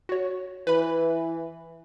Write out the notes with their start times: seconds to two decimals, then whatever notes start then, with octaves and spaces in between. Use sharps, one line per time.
0.09 F#4 C#5
0.67 E3 B4 B5